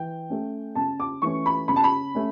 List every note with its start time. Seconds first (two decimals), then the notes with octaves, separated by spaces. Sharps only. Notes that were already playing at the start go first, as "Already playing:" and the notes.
Already playing: E3 G5
0.30 A3 C#4
0.75 C#3 A5
1.00 D6
1.22 E3 A3 C#4 C#6
1.46 B5
1.68 C#3 B5
1.76 A5
1.84 B5
2.15 A3 C#4